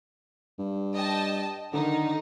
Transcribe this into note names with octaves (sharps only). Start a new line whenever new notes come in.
G2
D#5 G5 A5
D3 D#3 D#4